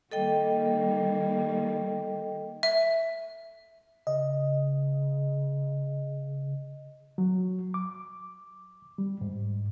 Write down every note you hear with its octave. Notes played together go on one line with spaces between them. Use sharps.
D#3 G3 A#3 A4 D#5 G5
E5
C#3 D#5
F#3
D6
G3
G#2